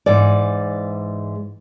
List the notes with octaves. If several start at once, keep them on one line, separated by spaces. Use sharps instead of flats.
G#2 E3 D5